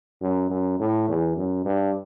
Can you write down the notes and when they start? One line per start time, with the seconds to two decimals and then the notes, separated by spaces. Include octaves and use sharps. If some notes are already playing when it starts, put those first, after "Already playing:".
0.21 F#2
0.50 F#2
0.80 A2
1.09 E2
1.37 F#2
1.65 G2